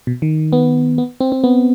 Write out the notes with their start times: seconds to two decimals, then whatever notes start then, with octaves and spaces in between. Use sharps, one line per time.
0.07 B2
0.22 D#3
0.53 B3
0.98 B3
1.20 C4
1.32 C4
1.44 B3